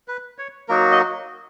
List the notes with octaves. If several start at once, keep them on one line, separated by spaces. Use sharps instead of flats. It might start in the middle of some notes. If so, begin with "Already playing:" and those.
B4
C#5
F#3 A#3 D#4 F#4 A#4
D#5